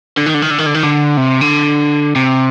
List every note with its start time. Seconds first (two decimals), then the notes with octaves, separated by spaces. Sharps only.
0.17 D3
0.26 D#3
0.34 D3
0.42 D#3
0.51 D3
0.58 D#3
0.66 D3
0.74 D#3
0.83 D3
1.17 C3
1.41 D3
2.16 C3